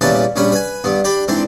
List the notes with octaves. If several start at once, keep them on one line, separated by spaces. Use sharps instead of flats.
E2 A#2 G3 C#4 B4 A5
A#1 G3 C#4 B4
B4 G#5
G2 B3
D4 G4 B5
G#2 E3 C4 D4